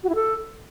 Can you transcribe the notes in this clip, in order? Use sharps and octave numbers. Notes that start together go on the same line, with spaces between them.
F#4
E4
A4